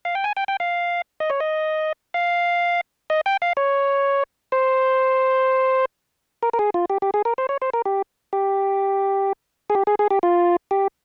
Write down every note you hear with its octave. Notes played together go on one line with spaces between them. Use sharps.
F5
G5
G#5
G5
G5
F5
D#5
C#5
D#5
F5
D#5
G5
F5
C#5
C5
A#4
A#4
G#4
F4
G4
G4
G#4
A#4
C5
C#5
C5
A#4
G4
G4
G#4
G4
G#4
G#4
G4
F4
G4